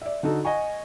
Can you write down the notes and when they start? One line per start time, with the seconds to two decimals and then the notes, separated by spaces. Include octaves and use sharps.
0.01 D5 E5
0.23 D3 D#4 F#4 A4
0.45 D#5 F#5 G#5 C#6